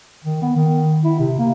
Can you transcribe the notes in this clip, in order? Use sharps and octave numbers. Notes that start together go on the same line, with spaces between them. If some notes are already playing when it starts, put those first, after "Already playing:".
D#3
B3
D#3
E4
C3
A#3